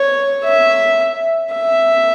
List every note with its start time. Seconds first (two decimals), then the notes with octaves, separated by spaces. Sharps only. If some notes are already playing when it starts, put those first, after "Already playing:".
Already playing: C#5
0.45 E5
1.54 E5